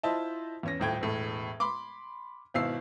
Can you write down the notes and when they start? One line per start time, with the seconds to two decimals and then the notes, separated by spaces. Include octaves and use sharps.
0.03 E4 F4 C5 D#5 E5 A5
0.63 E2 C#4 A#6
0.80 D#1 A2 G5 G#6
1.01 E1 A2
1.60 B5 C6 D6
2.54 G#1 B2 E4 F5 E6 C7